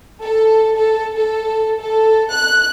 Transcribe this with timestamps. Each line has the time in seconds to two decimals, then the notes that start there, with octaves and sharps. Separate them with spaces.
0.21 A4
0.76 A4
1.17 A4
1.81 A4
2.32 F#6